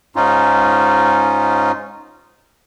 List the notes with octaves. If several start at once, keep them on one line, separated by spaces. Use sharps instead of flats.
G#2 C#4 D#4 F4